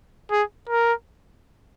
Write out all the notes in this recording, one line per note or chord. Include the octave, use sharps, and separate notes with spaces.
G#4
A#4